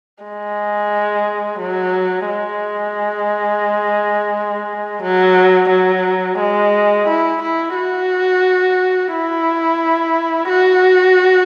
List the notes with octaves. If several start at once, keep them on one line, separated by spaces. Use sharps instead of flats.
G#3
F#3
G#3
F#3
F#3
G#3
E4
E4
F#4
E4
F#4